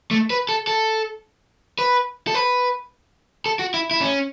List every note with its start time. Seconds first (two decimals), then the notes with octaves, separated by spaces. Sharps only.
0.11 A3
0.30 B4
0.49 A4
0.67 A4
1.79 B4
2.27 A4
2.35 B4
3.46 A4
3.59 F#4
3.74 E4
3.91 E4
4.01 C#4